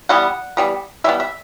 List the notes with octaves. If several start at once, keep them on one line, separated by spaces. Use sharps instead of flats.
E3 G3 B3 F#5
E3 G3 B3
E3 G3 B3 E5
E5